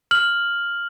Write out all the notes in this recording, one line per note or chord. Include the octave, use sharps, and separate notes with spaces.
F6 F#7